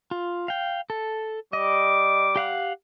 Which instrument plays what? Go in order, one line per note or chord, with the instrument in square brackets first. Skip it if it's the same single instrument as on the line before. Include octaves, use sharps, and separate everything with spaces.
[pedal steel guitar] F4
F5 G5
A4
[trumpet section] G3 D6 [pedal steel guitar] D#5
[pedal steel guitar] G4 F5 F#5